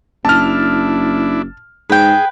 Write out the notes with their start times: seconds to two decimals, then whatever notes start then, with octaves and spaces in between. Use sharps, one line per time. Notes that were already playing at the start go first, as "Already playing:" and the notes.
0.25 F#1 D4 E4 A5 F6
1.90 G#2 G#4 B4 G5